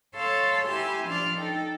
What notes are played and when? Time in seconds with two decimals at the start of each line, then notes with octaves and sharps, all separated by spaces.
0.14 A4 C#5 F5 C6 E6
0.65 E4 G4 G#5 C6 E6
1.06 F3 D4 D5 C6 F6
1.37 D#4 A4 G5